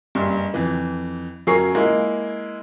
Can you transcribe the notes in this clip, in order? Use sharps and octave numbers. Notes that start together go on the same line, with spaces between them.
F#1 G2
F2 E3
F#2 F#3 G#4 A#4 C#6 C7
G#3 A#3 E4